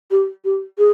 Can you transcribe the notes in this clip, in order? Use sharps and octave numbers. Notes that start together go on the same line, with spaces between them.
G4
G4
G#4